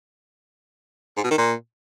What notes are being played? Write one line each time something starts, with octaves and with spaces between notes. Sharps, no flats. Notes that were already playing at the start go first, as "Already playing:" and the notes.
G#2
B2
D#3
A#2